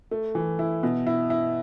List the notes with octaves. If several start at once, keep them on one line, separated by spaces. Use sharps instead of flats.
A3
E3
E4
B2
E4
E4